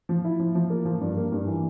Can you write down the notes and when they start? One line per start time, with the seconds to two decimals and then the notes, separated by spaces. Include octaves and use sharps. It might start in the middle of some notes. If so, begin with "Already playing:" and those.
0.09 F3
0.24 E4
0.39 F3
0.55 F3
0.70 A#3
0.85 F3
1.01 G2
1.17 A#3
1.32 G2
1.47 E3